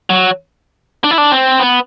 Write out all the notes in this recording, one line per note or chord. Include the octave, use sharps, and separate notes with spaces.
F#3
D4
E4
D4
C4
B3